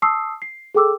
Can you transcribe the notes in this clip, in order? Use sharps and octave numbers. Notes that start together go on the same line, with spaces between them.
A5 C#6 D#6 E6 C7
C7
G#4 A4 G5 D6 E6